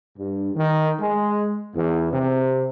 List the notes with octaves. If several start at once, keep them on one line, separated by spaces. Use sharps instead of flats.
G2
D#3
G#3
E2
C3